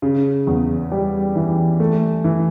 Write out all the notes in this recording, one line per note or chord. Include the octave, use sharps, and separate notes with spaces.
C#3
E2
G3
E3
A3
E3